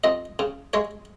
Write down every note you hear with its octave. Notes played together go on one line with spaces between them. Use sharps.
F2 D#5
C#3
G#3 C#5